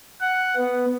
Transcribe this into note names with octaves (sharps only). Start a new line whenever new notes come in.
F#5
B3